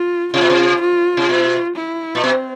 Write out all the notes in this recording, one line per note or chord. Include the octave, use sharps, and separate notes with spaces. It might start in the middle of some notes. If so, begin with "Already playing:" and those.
Already playing: F4
C3 F4
B2
C3
F4
C3
B2
E4
A#2
B2 C4